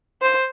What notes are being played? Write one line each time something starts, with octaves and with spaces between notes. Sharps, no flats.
C5